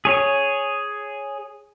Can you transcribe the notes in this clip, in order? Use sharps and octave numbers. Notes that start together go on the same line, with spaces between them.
G#4 C#5